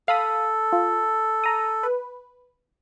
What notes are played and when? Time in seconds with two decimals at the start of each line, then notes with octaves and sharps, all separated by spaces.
0.08 A4 F5 B5 D#6
0.73 F4
1.44 A#5 D#6
1.83 B4